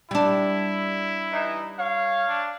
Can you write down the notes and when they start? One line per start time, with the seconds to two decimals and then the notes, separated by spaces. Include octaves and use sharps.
0.11 G3 D4 E4
1.32 E3 D#4
1.78 C#5 F5
2.27 D4